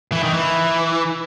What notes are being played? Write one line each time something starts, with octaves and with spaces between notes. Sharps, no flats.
E3
D#3
E3